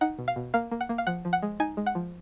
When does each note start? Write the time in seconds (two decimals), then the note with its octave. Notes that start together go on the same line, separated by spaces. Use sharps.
0.01 D#4 F#5
0.19 B2
0.28 F5
0.36 B2
0.54 A#3 F5
0.71 A#3
0.81 F#5
0.89 A#3
0.98 F5
1.07 F3 F#5
1.25 F3
1.33 F#5
1.42 G#3
1.60 D#4 G#5
1.77 G#3
1.86 F#5
1.95 F3